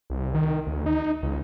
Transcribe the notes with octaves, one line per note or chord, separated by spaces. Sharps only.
C2
D#3
D2
D#4
C#2